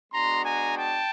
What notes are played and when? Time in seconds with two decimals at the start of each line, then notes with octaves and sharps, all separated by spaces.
0.12 G#3 B3 D4 F#4 A#5 C6
0.45 G#5 A#5
0.78 G5 A5